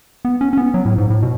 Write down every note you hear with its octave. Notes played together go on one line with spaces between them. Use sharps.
B3
C#4
C#4
B3
F#3
A2
G#2
A2
B2